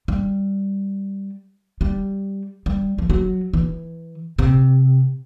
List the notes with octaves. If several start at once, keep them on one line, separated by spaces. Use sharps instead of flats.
G3
G3
G3
F3
F#3
E3
C3